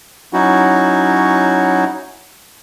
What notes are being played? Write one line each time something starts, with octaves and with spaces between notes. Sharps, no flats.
F#3 C#4 D#4 E4 F#4